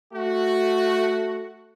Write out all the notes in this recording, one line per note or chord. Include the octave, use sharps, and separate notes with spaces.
A3 F#4